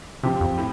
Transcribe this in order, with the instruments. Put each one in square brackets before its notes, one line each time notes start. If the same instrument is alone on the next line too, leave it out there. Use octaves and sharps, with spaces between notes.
[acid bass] C3 [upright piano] F3 C4 G4
[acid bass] F2
[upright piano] A2